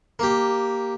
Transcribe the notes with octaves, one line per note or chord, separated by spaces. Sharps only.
A#3 G4